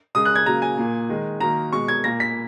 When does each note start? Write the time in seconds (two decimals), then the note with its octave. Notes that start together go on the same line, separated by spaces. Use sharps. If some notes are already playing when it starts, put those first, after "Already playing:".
0.15 C#3 G#3 D#6
0.25 F#6
0.36 G#6
0.46 C#3 F#3 A#3 A#5
0.62 G#5
0.77 A#2 A#3
1.09 D#3 G#3
1.40 D#3 F#3 A#3 A#5
1.73 B2 G#3 C#6
1.88 G#6
2.04 A#2 A#3 A#6
2.20 B6